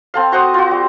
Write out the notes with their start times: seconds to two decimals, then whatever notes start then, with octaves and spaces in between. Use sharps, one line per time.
0.14 C4 A4 F5
0.32 F#4 C5 F#5 D#6
0.54 F4 F#4
0.71 G3